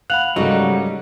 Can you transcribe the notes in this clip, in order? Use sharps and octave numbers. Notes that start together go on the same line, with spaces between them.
F5 F#5 B5 F#6 F7 F#7
G#2 C#3 F#3 G3 A#3 D#4 F#4 A4